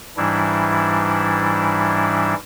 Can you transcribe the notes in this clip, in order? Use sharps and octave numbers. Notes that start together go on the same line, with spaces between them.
G#2 E3 G3 D4 E4